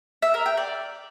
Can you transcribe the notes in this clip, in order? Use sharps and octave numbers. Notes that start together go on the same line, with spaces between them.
E5
A#4
G5
D5